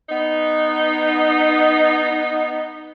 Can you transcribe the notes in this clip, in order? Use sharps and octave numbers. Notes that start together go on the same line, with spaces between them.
B3 D#4